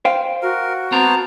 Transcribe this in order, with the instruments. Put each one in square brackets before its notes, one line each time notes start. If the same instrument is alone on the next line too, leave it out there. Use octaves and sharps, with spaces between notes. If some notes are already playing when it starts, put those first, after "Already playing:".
[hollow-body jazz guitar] C5 F5 G5
[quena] F#4 [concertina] A#4
[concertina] B3 C5 A5 [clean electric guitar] C4 A#4 A#5